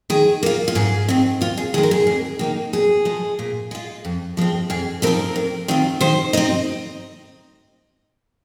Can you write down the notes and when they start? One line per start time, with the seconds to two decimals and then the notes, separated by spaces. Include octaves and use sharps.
0.10 D#3 G#4
0.43 A#3 F4
0.68 F4
0.75 G#2 G#4
1.09 D#3 C4
1.41 D#2 F4
1.58 G#4
1.74 D#3 G#3 G#4
1.83 A#4
1.91 G#4
2.07 F2
2.39 D#3 A#3 D#4
2.73 A#2 G#4
3.05 F3 G#3
3.39 A#2
3.71 G#3 F4
4.05 F2
4.37 F3 G#3 C4
4.70 F2 G#4
5.02 F3 C4 D#4 A#4
5.36 F2
5.68 D#3 C4 F4
6.01 D#3 C5
6.33 C4 D#4 D#5